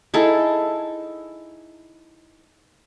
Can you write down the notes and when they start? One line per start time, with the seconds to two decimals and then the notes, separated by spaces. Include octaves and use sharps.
0.14 D#4 E4 G#4 A4